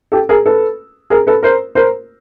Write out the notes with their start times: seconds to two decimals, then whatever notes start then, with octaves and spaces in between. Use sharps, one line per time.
0.12 G4 A4
0.29 G#4 A#4
0.46 A4 B4
1.10 G#4 A#4
1.27 A4 B4
1.43 A#4 C5
1.75 A#4 C5